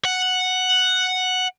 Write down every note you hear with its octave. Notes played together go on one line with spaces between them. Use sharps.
F#5